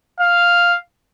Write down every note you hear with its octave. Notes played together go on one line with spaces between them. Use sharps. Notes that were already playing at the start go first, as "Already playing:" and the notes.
F5